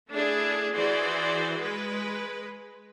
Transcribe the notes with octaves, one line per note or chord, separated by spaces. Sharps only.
A3 D4 E4 G#4
E3 F#4 G#4 C5 D5
G#3 B4